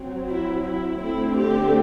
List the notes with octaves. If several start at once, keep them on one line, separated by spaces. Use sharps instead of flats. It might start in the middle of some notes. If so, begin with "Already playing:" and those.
Already playing: F#3 C4
E4
E4
D3 A3 C4 E4
G4